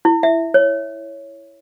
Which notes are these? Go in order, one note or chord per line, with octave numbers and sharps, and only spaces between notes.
E4
E5
C#5